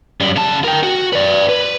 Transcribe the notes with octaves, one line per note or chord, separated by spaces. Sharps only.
F#2 G3
C#3 A5
A#4 G5
F#4
B4 D5
B4